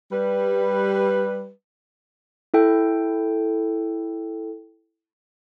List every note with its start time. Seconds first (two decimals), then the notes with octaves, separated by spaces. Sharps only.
0.12 G3 B4
2.54 E4 A4 G5